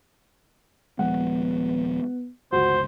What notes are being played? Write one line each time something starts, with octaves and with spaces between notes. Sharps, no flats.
D#1 F3 G#3 B3 F#5
G1 C#2 F#4 C5